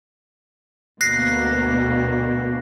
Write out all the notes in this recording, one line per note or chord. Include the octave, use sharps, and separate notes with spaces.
D2 B2 A#3 F#6 A#6 C7